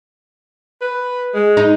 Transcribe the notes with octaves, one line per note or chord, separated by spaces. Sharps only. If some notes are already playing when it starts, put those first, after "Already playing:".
B4
G#3
D#4